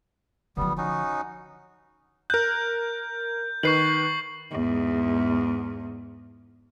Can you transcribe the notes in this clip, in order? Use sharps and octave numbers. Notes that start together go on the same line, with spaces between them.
D3 F3 G3 B3
C#4 D#4 F#4
A#4 F#6 G6
D#3 B4 C#6 C7 F#7
E2 G#2